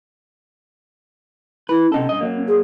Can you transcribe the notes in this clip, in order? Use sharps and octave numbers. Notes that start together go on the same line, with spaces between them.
E4 B4
C3 C#4 D#4 A4
G2 D#5
F#3 A#3
G#4